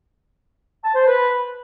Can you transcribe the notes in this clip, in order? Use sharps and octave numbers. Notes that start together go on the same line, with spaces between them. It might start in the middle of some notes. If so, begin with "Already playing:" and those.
A5
C5
B4